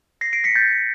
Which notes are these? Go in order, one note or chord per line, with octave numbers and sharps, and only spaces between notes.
A#6 C7
C7 D7
B6 C#7
G6 A6